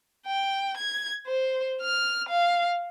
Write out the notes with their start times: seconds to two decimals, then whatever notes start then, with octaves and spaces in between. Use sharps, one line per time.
0.27 G5
0.77 G#6
1.27 C5
1.82 F6
2.29 F5